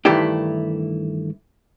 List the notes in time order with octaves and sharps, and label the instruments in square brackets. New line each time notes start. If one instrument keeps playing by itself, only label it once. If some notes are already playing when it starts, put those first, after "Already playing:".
[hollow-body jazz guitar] G2 D#3 E3 A3 E4 G4